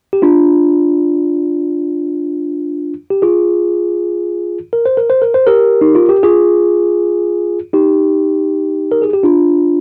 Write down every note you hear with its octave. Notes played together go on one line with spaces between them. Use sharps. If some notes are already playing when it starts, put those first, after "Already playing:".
G4
D4 F4
G4
F4 G#4
A#4
C5
A#4
C5
A#4
C5
G4 A#4
D#4
F4
G4
F4 G#4
D#4 G4
A#4
G#4
G4
D4 F4